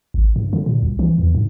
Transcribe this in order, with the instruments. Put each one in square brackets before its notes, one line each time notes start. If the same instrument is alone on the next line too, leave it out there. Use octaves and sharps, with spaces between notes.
[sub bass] G#1
G2
D3
A#2
C2
E3
E2
G#2